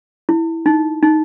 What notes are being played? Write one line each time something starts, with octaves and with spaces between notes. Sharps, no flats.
E4
D#4
D#4